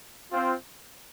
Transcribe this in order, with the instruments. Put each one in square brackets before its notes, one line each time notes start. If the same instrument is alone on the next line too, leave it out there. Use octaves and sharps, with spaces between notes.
[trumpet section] C4 F4